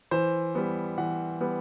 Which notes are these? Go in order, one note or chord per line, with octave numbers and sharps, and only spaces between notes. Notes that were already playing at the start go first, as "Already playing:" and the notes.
E3 C5
G3 B3
E3 F#5
G3 B3